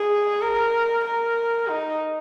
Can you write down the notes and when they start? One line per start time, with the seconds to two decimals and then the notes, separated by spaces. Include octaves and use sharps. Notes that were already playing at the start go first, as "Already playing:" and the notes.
Already playing: G#4
0.42 A#4
1.05 A#4
1.70 D#4